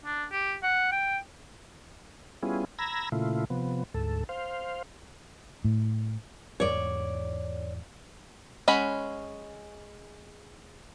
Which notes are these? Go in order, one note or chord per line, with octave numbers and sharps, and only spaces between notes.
D4
G4
F#5
G5
G3 B3 C#4 E4 F4 G#4
A#5 B5 E6 G#6 A#6
A#2 C#3 A3 E4 F4
C3 F3 B3
D2 G#2 A4
C5 F5
A2
E2 G#2 C#5 D5
G#3 C#4 F#5 B5